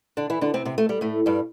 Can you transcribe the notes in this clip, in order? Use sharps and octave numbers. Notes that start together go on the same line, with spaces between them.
D3 D4
E3 E4
D3 D4
C3 C4
C3 C4
A3
G3
A2 A3
G2 G3